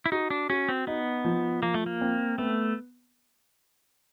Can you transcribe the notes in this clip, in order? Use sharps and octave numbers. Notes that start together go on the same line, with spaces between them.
E4
D#4 F#4
D4
C#4 F#4
C4
B3 D#4
F3
F3 A#3
A3
A#3
C4
A3 B3